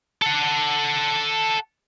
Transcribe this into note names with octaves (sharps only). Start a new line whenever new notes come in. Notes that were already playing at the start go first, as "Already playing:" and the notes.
A4 F#5